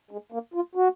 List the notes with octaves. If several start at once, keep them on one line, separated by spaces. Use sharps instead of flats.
G#3
A#3
F4
F#4